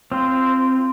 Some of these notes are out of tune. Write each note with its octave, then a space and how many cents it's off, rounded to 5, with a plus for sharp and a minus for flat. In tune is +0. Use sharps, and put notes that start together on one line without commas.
C4 +0 F4 -15